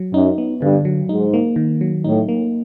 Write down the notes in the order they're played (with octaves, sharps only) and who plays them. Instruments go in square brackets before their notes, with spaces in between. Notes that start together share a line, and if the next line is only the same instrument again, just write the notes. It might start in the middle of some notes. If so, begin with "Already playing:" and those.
Already playing: [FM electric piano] F#3
[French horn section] F#2 [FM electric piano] D#4
[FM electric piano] B3
[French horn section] G2 [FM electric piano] D3
[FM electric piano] F#3
[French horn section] G#2 [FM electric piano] D#4
[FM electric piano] A#3
D#3
F#3
[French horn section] A2 [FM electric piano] D#4
[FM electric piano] A#3